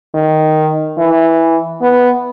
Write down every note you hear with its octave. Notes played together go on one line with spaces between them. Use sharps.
D#3
E3
B3